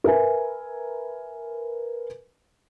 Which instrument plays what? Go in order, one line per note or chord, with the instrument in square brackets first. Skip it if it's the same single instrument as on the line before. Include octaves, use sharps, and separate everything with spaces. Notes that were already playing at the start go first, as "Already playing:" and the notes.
[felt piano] A#4 B4 E5 G#5